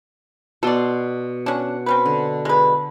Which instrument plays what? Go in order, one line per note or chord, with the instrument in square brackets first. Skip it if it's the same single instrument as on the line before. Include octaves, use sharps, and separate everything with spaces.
[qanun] B2 C6 [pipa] A4 D5
[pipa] C#4 D4 [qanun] F#5
[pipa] C4 C#4 B4
[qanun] D3
[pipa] G#3 B4